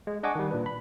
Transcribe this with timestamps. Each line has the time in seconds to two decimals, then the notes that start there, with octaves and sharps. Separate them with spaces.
0.07 G#3
0.23 D4 D#5 F#5 G#5 C#6 D6
0.35 D#3 G3
0.51 A#2 D4 B4
0.66 B5